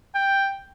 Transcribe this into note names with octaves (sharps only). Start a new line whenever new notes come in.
G5